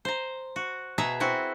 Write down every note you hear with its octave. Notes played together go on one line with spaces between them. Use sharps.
C5 A#5
F#4
B2 G#4 E5 A#5
C4 E4 F#4